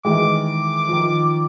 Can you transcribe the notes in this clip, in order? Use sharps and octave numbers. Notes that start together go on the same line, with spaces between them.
D#3 E3 G#3 D6
D#3 F3